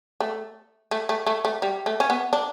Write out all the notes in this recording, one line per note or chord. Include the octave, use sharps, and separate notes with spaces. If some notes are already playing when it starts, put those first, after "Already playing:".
A3
A3
A3
A3
A3
G3
A3
C#4
B3
D4